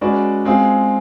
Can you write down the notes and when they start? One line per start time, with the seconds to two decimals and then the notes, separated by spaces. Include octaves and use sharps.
0.01 G#3 C#4 F#4 B4 D5
0.45 G#3 C4 F4 G#4